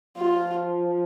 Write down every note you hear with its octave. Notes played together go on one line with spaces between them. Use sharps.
F3 F4